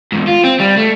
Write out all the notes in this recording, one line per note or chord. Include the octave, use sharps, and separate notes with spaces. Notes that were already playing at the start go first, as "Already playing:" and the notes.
E2 G#2
F4
C4
G3
A3